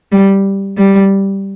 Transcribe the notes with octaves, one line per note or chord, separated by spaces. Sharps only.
G3
G3